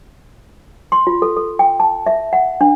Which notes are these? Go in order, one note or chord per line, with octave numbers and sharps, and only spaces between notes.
C6
F4
A4
A4
G5
A5
E5
F#5
D4